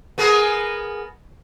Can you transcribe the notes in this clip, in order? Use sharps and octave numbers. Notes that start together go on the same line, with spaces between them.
B3 G#4 A#4